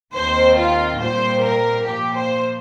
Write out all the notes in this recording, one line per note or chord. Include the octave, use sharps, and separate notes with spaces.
D#2 D#3 C4 C5
F4
A#2 G3 C4 C5
A#4
A#2 F3 A#3 G4
C5